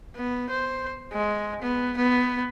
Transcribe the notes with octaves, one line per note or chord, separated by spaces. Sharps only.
B3
C5
G#3
B3
B3